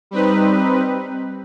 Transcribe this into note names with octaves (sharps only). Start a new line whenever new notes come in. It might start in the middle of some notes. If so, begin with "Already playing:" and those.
G3 C4 D#4 B4